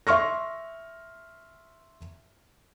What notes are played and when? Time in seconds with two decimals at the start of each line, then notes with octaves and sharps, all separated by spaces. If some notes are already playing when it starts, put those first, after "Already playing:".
0.07 E5 C6 C#6 F6 A#6